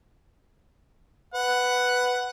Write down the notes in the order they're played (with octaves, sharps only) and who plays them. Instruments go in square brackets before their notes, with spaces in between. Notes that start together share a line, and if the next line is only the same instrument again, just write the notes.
[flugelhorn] B4 [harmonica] F#5